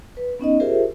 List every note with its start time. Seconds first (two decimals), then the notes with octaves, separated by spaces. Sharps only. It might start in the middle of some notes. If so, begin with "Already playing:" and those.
0.17 B4
0.39 B3 C#4 D#4 D#5
0.60 F4 G4 G#4 A#4 C5 E5